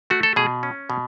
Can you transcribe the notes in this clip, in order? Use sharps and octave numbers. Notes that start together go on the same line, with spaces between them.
A3 F#4
A4
B2 G#4
C#4
B2